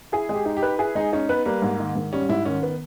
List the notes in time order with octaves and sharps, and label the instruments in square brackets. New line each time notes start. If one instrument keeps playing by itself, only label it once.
[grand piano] E4 [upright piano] G#4
[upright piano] G#3
[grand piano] G4
[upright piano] D#4
[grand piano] G4
[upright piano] B4
[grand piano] E4 [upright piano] G#4
[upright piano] G#3 [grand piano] D#4
[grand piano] C#4 [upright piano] D#4
[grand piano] B3 [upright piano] B4
[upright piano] G3 [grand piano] A#3
[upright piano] G#2
D#3
G#2
[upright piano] G3 [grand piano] C#4
[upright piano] G#2 [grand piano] E4
[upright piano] D#3 [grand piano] C#4
[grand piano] B3